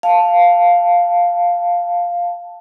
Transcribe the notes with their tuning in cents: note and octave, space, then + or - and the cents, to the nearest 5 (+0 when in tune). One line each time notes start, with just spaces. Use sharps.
F5 +0 A5 +0